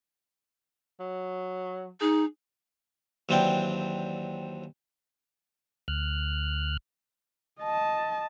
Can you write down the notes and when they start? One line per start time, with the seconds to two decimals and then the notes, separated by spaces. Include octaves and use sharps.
1.00 F#3
2.01 D#4 G#4
3.29 D#2 E3 F#3 C4 D4 G5
5.88 D2 F6 F#6
7.60 D#5 A5